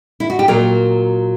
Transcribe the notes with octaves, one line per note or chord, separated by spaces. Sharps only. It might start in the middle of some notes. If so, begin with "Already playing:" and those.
E4
F#4
G4
A#2 F#3 A#4